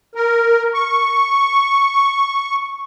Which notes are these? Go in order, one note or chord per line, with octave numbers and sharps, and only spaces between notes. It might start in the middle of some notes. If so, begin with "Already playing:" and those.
A#4
C#6